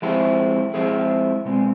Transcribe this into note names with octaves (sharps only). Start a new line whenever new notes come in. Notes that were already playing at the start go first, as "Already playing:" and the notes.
F3 G#3 C4 E4 G#4
F3 G#3 C4 E4 G#4
B2 G#3 C4